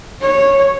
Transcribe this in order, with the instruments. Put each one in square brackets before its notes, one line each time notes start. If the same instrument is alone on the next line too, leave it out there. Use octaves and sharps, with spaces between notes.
[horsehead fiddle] C#5